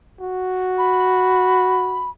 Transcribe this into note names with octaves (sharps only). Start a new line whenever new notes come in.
F#4
B5